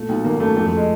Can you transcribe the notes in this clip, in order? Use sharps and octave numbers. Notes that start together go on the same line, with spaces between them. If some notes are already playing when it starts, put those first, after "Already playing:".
Already playing: A#2 A3
B1
G#1 A#3
F#2 A3
F2 A3
A3
G#3